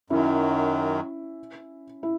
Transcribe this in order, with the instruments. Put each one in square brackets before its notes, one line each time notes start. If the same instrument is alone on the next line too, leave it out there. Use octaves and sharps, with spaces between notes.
[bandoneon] F#2 D#3 F#3 [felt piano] C#4 E4
[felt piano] E4